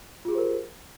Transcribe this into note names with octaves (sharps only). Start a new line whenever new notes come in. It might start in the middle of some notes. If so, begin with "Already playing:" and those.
F4 G4 G#4 A#4 C5